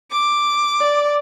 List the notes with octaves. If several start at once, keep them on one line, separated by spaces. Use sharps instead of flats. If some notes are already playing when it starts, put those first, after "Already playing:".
D6
D5